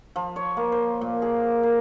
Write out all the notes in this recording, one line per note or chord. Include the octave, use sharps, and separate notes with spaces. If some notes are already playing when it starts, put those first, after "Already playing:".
F3
C#5
A#3
C5
A#2
G#4
A#4